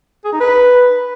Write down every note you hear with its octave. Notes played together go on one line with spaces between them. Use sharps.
G#4
D#4
B4